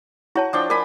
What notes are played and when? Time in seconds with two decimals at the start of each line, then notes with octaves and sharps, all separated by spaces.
0.35 E4 F#4 C#5 A5
0.53 F3 D4 G5
0.70 D4 A#4 G#5 B5